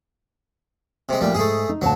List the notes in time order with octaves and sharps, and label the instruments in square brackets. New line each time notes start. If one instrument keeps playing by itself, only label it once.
[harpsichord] C3 G#3
[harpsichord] A#1 G3 [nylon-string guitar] A3 A#3
[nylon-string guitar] G#2 [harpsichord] A3 G#4
[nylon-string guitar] D#4
[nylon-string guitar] D2 A#2 A5 [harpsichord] F#3